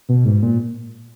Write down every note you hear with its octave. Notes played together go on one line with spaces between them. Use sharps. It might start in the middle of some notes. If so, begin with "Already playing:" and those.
B2
G#2
A#2